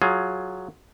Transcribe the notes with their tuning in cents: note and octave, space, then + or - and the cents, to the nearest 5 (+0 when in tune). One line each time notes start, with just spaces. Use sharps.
F#3 +0 F4 +0 G#4 +15